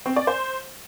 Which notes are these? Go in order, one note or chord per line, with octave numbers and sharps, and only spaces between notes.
C4
D5
C5